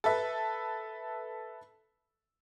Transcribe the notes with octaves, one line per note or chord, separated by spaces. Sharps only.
A4 B4 E5